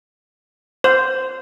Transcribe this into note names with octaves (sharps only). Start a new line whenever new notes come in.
C5